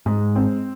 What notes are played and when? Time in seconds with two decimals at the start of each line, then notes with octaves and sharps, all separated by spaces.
0.06 G#2 G#3
0.36 C4